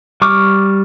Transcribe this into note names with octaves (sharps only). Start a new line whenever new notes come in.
G3 C#6 D6 F6